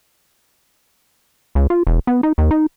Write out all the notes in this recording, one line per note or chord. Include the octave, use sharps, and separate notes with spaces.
C#2
F4
E1
B3
D#4
D#2
D#4